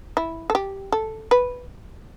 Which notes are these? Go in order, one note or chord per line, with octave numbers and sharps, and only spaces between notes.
E4
A4
G4
A4
B4